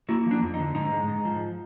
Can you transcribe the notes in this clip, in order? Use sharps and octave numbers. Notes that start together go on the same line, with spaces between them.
A#3 E4 F#4
F3 D4
F2
D#4
D3
G#2 D#4
G#3
G#2
F3